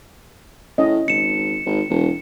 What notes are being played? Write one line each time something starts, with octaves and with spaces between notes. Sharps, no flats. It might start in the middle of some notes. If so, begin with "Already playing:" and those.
A2 C#4 D#5
G#1 C#7 E7
G#1
E1